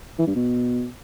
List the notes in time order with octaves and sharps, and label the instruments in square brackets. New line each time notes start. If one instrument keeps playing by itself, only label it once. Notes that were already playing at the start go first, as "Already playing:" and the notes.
[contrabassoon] E3
G2
B2